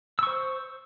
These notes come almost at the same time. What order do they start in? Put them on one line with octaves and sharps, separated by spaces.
E6 C#6 C5